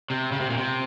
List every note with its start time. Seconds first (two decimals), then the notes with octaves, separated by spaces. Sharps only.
0.10 C3
0.32 C#3
0.40 C3
0.50 A#2
0.57 C3